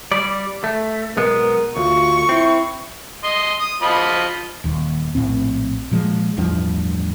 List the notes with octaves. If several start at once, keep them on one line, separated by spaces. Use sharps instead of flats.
G3 D5
A3
B1 G#3 B3 A#4
D2 F4 C#6
C4 E4
D#5 C6
D#6
F3 D#5 B5
D#1 D#2
A#1 A2 C4
A#2 F3 G#3
A1 E2 G2 F3